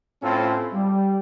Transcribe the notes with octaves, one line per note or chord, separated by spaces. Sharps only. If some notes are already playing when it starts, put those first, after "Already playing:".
A2 C4 C#4 E4 F4 A4
G3